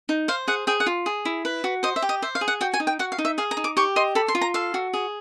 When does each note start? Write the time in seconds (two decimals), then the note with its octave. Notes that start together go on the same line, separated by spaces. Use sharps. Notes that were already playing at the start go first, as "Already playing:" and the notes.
0.09 D#4
0.28 C5 F5
0.48 G#4 F#5
0.67 G#4 G5
0.80 F#5
0.86 F4
1.06 G#4
1.25 E4
1.45 B4
1.64 F#4
1.83 C5 D#5
1.96 E5
2.02 G4
2.09 D#5
2.22 C5 E5
2.35 F5
2.41 G#4
2.48 F#5
2.61 F#4 G5
2.74 G#5
2.80 D#4
2.87 G5
2.99 F#4 F#5
3.12 F5
3.18 D#4
3.25 E5
3.38 G#4 F5
3.51 A#5
3.57 D#4
3.64 D6
3.77 G4 C#6
3.96 D#5 C6
4.15 A4 B5
4.28 C6
4.35 F4
4.41 A#5
4.54 A4 F5
4.74 F#4
4.94 G#4